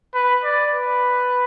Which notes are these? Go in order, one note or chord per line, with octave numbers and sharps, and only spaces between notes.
B4
D5
B4